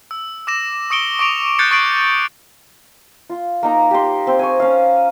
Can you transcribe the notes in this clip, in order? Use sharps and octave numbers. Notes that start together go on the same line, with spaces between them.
E6
D6 E6 A#6 E7
C#6 D#6 C#7 D7 G7
C#6 D6 D7 F7
F#6 G6 A6 C7 C#7
C#6 D#6 A6 C7 D7 F#7
F4
A#3 D#4 A#5
G4 C6
C4
G#5 C#6
C#4 F5